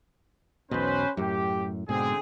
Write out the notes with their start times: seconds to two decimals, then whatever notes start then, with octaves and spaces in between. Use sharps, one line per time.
0.71 B1 E2 B2 C#4 B4 C5
1.17 F#2 A2 G4
1.89 G#2 B2 D3 C4 G#4